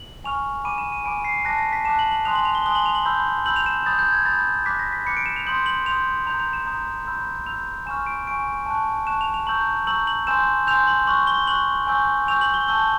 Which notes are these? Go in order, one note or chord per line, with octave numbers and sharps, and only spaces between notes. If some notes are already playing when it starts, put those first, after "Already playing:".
Already playing: F#7
G#5 C#6 F6 F7
G#5 B5 D6 D#7
E7
D#7
G#5 B5 D6 D7
C7
A5 D6 F#6 A#6
A#6
B6
A5 D6 F#6 E7
F#7
F#7
G#5 C6 D#6 F#6 F7
F#7
F7
G7
G#5 C6 D#6 F#6 G7
F#7
F7
F#7
B5 E6 G6
B5 E6 G6 F#7
F7
E7
B5 D#6 G6 A6
G6
G#6
B5 D#6 G6 A6
B5 D6 F#6 B6
A#6
B6
B5 D6 F#6 C#7
D7
E7
F7
C6 D#6 G6 F#7
F#7
C6 D#6 G6 F7
A#5 D#6 G6 F7
F7
E7
A#5 D#6 G6
B5 E6 G6
B5 E6 G6 F7
G#5 C#6 F6 E7
D7
G#5 C#6 F6 D7
A5 C#6 F#6
A5 C#6 F#6 E7
F7
F7
A#5 C#6 E6 G6 F#7
A#5 C#6 E6 G6 F#7
F#7
G#5 C6 E6 G6 E7
G#5 C6 E6 G6 F7
F#7
C#6 F#6 F#7
G7
C#6 F#6 F#7
G#5 C#6 E6 G6
G#5 C#6 E6 G6 F7
F#7
G7
A5 C#6 E6 G6 G7